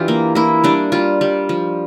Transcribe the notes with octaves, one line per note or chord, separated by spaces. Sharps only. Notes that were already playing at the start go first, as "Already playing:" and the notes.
Already playing: E3 D4 F4 G4
A#3
A#3 E4
G3 D4
G3 F4
G3
F3